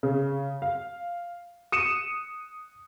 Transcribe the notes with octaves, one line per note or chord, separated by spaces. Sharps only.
C#3
F5
D#6 C#7 D#7 E7